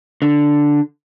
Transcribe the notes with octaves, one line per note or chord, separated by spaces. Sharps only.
D3